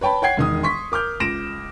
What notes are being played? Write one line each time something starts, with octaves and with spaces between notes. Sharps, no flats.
B4 C#5 G5 A5 B5
C#5 F#5 G5 G#6 C7
E1 D#3 D#6
C6 C#6 B6
A#4 D6 F6 G6
C#2 A#6 D7 E7